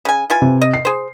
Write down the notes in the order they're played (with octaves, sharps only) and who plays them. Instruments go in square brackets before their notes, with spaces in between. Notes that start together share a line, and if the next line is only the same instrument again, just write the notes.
[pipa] C#3 G#5
E3 F4 G#5
[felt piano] C3
[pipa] D#5
[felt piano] C7
[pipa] G#4 C5